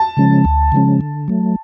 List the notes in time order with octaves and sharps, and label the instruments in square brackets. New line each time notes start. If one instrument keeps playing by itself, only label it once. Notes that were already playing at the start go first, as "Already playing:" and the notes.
Already playing: [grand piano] A5
[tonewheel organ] C#3 F3 G#3 C#4
D2
C#3 F3 G#3 C#4
D3
F#3 A3